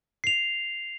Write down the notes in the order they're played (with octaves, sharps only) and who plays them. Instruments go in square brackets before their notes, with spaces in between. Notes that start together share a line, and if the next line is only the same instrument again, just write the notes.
[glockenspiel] C7 F7